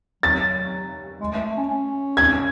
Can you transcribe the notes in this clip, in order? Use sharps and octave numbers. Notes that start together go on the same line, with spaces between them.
F#3 A6
G#3
A3
A3
C#4
C#4
G#6